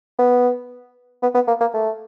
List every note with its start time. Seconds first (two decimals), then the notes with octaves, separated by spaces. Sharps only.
0.19 B3
1.23 B3
1.35 B3
1.48 A#3
1.61 A#3
1.74 A3